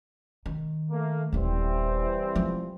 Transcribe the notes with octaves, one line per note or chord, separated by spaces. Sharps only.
D#3
A3 A#3
D#1 E3 G3 B3 C4
F3